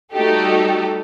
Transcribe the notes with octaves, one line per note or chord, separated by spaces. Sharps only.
G3 A3 D#4 F#4 G4 A4